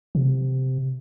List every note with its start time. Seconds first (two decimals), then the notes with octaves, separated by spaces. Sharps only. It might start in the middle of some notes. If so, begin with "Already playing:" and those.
0.15 C3